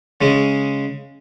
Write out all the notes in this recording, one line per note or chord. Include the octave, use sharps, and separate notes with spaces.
C#3 G#3 C#4